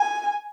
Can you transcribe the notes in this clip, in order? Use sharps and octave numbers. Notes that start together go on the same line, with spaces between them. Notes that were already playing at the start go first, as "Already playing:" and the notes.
Already playing: G#5